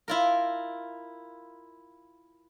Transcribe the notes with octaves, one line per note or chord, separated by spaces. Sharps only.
E4 F4 A#4